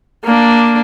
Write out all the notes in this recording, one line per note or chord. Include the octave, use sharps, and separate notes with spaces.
A#3 D4